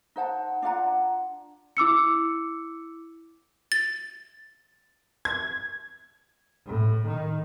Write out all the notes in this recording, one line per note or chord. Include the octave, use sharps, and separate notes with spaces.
D#4 C5 F#5 A5
D4 F4 F#5 A#5
E4 D6 E6 C#7
A6
G#6
A2
D#3